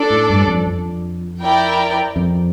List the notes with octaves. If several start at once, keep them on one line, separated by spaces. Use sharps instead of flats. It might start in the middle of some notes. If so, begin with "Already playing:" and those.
Already playing: D4 A4 D5
A2
G2
F2
F2
E4 A#4 D5 G5
F2